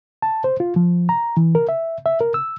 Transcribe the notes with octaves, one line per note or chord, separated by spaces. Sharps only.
A5
C5
F4
F3
A#5
E3
A#4
E5
E5
A#4
E6